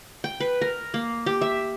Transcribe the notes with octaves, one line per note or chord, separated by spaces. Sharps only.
G5
B4
A#4
A#3
G4
E5